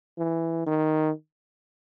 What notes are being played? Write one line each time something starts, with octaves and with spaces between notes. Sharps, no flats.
E3
D#3